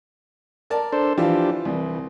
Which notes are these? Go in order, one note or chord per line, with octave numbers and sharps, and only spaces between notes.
A#4 D5 A5
D4 A4 C5
E3 F3 D4 F4 G4
C2 E3